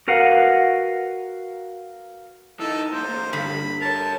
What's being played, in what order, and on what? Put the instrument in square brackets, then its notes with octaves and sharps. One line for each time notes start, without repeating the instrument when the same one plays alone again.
[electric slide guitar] F#4 A#4 B4 F5 F#5
[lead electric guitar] E3 D#4 [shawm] A4
[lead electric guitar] B1 A#2 [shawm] C5
[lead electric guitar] E2 A#2
[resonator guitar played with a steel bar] G2 D3 [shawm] B5
[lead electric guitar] A#4 C#5 [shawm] A5